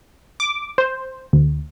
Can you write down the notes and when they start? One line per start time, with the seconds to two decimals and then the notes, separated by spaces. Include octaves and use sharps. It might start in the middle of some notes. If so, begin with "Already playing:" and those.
0.40 D6
0.78 C5
1.33 D2